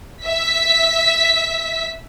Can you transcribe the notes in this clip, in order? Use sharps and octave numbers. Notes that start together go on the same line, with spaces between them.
E5 B6